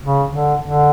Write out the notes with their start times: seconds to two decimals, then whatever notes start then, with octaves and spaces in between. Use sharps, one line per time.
0.03 C#3
0.33 D3
0.64 D3